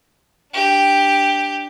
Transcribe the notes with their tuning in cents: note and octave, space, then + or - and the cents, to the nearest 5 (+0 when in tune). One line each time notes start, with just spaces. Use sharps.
D4 +0 G4 +0